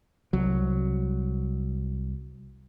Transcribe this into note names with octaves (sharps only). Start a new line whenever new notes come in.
C2 F#3